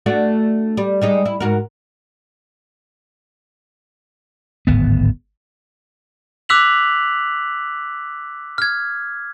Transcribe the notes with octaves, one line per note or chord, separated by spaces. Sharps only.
A3 D4 F#4
G3
G3 G#3 D#4
E4
G#2 F#4 A#4
D1 G#1 B3
D6 E6 F#6 B6 F7 F#7
F6 G#6